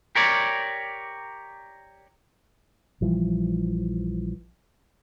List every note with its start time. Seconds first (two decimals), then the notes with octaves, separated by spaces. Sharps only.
0.15 G4 A#4 C#5 D5
3.01 A#1 E3 F3 G3